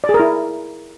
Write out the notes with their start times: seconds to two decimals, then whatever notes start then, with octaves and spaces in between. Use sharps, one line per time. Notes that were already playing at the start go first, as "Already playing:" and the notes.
0.04 D5
0.09 G#4
0.14 A#4
0.20 E4